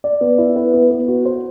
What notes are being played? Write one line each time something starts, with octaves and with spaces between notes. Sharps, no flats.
D5
B3
E4
B4
B3
B3
F#4
C5